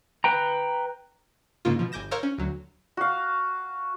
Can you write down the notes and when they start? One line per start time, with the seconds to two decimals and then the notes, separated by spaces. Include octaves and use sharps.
0.24 B4 G5 A#5
1.65 G#2 C#3 A#3 F4
1.79 B2 F3
1.92 G1 G#5 D6 G6 A#6 E7
2.11 A#4 C5 C#5 F5 A#5 E6
2.23 C#4
2.38 D2 F#3
2.97 F#4 F5